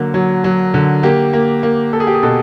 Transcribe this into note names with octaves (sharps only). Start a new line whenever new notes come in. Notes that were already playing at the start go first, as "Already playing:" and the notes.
Already playing: D3 F#3 A#3
F#3
F#3
D3
A#3 G4
A#3
A#3
A#3 A4
G#4
G4
G#4
B2 A4